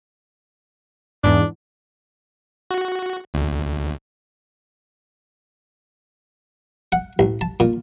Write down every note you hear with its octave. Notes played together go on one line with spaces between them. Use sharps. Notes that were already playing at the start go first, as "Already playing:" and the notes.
E2 G#2 D4
F#4
D2
F#5
A1
A5
A#2